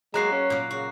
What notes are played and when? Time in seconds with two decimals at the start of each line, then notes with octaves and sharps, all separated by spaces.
0.14 F#3 G#3 A#3 F#4 A#5 F#6 C7
0.31 C#4
0.50 A#2 A#3
0.71 C#3 F#4